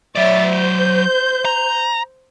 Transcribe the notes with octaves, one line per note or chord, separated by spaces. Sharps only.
F#3 C#5 D5 E5 A6
C5 G6
A#5